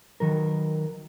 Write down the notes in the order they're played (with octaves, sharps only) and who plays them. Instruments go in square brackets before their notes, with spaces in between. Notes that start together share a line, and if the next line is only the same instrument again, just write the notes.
[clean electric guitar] D#3 F#3 A#4